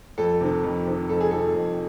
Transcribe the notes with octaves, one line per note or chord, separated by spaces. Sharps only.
F2 A4
C3 D#3
F2
C3 D#3
F2 A4
G#4
C3 D#3 A4
F2